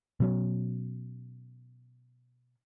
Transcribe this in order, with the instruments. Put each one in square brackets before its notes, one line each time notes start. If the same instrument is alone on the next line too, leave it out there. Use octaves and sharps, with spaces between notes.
[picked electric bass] B2 F#3 C#4